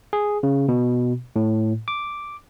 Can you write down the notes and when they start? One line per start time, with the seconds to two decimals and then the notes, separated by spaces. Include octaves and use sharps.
0.13 G#4
0.43 C#3
0.68 B2
1.36 A2
1.88 D6